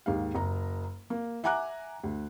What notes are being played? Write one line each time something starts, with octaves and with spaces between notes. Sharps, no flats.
D#2 G#2 F5
F#1 A#5
A#3
E5 F#5 G#5 A#5 D6 F#6
D2